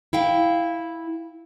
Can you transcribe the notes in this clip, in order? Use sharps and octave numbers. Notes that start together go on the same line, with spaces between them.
E4 F5 G5